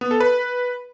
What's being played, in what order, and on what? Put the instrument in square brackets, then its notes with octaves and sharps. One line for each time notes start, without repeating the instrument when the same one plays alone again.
[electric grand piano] B3
A4
B4